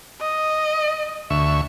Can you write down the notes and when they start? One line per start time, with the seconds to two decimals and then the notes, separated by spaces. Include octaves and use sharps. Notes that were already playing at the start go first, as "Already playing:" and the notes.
0.21 D#5
1.30 D2 E5 C#6